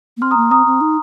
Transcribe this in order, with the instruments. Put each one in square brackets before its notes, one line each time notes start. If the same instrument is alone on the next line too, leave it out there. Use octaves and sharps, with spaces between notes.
[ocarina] A#3
[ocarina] C4 [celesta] C6 F6
[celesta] A#5 D#6
[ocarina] A#3
[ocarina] C4 [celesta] A#5 D#6
[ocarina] C4
D#4